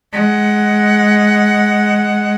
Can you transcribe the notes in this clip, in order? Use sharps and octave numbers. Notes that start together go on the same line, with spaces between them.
G#3 F#5